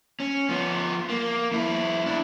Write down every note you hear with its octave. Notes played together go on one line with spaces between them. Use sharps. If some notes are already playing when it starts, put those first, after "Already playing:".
C#4
F3 B3
A#3
F2 E4
D4 E4